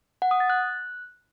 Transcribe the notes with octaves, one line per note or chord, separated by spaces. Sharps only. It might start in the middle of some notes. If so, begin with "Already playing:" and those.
F#5
D#6
A6
F#6